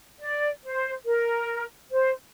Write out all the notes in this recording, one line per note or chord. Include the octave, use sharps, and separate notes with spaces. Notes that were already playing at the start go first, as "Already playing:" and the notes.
D5
C5
A#4
C5